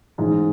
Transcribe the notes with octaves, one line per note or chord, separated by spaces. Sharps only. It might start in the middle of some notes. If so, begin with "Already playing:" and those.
A1 G#2 G#3